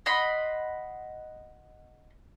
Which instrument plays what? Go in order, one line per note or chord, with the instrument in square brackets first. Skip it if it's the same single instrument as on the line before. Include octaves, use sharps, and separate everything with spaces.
[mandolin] D#5 F#5 B5 C6